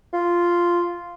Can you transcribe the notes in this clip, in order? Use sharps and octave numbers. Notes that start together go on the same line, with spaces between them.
F4